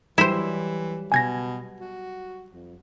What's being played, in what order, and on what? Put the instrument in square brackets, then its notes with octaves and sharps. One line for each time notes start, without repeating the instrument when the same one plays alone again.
[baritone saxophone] E3 [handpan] F#3 G3 G4 [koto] E4 C5
[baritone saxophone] B2 [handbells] G#5 G#6 A#6
[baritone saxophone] F#4
F2